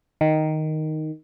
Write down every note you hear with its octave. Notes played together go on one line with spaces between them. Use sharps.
D#3